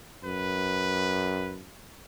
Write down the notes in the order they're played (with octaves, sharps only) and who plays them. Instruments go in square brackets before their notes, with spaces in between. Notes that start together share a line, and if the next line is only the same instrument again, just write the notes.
[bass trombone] F#2 [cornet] B4